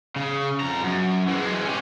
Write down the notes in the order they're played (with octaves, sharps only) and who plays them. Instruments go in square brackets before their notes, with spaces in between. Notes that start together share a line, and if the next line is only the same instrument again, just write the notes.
[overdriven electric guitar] C#3
F2 A#5
F#2
E3 G#3
C#4 G4